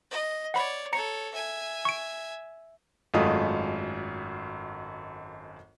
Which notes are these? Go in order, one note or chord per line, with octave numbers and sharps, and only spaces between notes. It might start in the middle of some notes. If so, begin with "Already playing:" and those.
D#5
C#5 D5 F#5 B5
A4 C#5 A#5 C#7
E5 G#5
C#6 D7
G#1 F#2 G#3 A3 F4 D#6